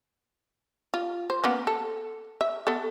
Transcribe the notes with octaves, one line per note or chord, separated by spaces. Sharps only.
F4
C5
A#3 B3 C#4
A4
E5
B3 A4